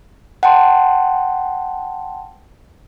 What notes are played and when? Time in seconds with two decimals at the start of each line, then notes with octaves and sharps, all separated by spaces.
0.43 F#5 G5 A5 C6